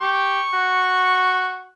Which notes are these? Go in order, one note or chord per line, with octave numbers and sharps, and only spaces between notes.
G4 C#6
F#4